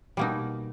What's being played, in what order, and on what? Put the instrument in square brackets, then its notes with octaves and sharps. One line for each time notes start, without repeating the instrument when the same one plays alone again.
[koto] B2 G3 A#3 D#4